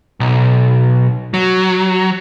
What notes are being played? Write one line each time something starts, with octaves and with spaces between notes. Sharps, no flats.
B1
F#3